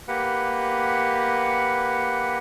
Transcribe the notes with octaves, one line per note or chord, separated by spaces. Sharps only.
A#3 G4 B4 F#5